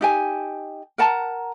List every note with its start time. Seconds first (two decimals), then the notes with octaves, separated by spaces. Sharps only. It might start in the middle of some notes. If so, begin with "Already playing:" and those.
0.01 D#4 G4 G#5
0.98 A#4 F#5 A5 A#5